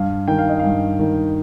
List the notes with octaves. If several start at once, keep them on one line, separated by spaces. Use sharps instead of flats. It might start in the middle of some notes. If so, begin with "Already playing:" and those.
Already playing: G2 F5
D#3 G5
F5
D#5
G2 F5
D#3